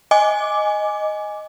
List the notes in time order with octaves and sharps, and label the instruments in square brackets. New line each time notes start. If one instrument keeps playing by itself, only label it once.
[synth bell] D#5 G#5 D6